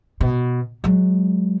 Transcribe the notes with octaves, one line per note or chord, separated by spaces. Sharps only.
B2
F#3 G#3